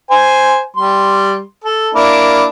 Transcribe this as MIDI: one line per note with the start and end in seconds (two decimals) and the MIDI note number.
0.10 0.62 72
0.10 0.62 80
0.76 1.40 55
0.76 1.40 84
1.64 1.90 69
1.95 2.47 58
1.95 2.47 62
1.95 2.47 64